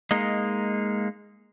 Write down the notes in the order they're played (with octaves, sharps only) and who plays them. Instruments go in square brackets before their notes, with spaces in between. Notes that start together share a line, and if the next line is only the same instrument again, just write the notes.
[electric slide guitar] G#3 A#3 D#4